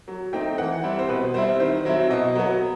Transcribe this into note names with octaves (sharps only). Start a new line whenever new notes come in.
F#3
A3 C4 D#4 G5
E3 F#5
G3 C4 E4
C5
B2 B4
G3 C4 E4 C5
D#3 C5
F#3 C4 E4
B2 D#5
F#3 B3